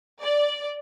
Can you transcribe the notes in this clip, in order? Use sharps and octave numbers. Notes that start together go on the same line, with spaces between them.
D5